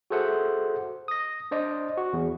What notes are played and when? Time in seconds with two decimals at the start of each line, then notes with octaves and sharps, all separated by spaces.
0.10 F#4 G#4 A4 C5 E5 F#5
1.08 D#6 A#6
1.51 D4 C5 D5 D#5
1.97 F#4
2.13 E2